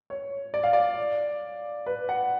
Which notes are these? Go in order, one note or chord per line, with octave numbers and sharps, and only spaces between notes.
C#5
D5
F5
D5
B4
F#5